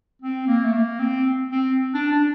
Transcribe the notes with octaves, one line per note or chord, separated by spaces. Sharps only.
C4
A#3
A3
A#3
C4
C4
D4
D4